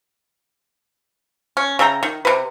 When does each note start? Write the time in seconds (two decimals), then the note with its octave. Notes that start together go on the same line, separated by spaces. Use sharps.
1.57 C#4
1.79 C#3 E5 G5 A#5
2.03 D#3
2.25 C3 B4